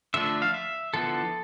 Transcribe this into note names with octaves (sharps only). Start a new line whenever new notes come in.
D3 F3 A3 D4 E5
F5
E5
D3 F3 B3 E4 A4